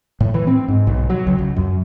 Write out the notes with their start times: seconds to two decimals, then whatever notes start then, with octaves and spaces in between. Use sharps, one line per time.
0.20 A2
0.34 E3
0.47 C4
0.68 G#2
0.87 B1
1.10 F#3
1.27 C#2
1.39 C#2
1.56 F#2